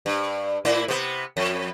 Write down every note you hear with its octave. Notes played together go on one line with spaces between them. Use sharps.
G2
A2 E4
C3 B3
F2